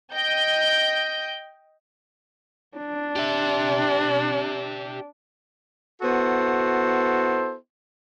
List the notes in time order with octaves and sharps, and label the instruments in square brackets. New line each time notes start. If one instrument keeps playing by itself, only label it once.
[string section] D#5 G5 G6
[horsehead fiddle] D4
[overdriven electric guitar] G4 E5
[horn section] B3 E4 F#4 A4 C5